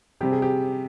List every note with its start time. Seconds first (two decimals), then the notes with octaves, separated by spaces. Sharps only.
0.21 C3 G3 C4 G4
0.32 G#4
0.42 G4